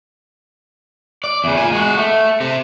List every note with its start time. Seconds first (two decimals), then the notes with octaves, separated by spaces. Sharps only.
1.24 D5
1.44 E2 C#3
1.57 A#2 G#5
1.72 G#3 F#4
1.97 A3
2.41 C3